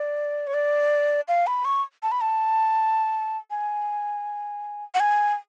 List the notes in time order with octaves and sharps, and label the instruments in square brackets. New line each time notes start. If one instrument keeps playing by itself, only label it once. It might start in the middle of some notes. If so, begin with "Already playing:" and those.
Already playing: [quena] D5
C#5
D5
F5
B5
C#6
A5
B5
A5
G#5
F#5
G#5